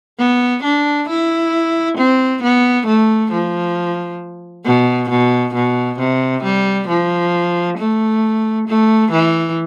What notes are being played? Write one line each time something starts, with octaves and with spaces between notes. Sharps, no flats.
B3
D4
E4
C4
B3
A3
F3
B2
B2
B2
C3
G3
F3
A3
A3
E3